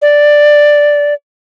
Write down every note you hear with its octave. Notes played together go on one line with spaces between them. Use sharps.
D5